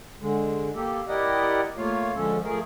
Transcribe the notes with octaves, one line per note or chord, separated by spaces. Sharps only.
D3 G#3
A#3 G4 A4
E4 G4 A#4 D5 D#5 F#5
A3 A#3 F4 C#5 F5
D3 F3 G#3 C#4 A4
F3 A3 G#4 A#4